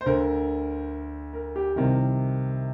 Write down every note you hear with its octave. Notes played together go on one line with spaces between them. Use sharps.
C5
D2 D3 A#4
A#4
G4
C2 C3 D#3 A#4